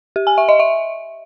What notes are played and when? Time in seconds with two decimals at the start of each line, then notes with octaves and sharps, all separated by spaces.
0.16 G4
0.27 G#5
0.38 E5
0.49 D#5
0.59 E5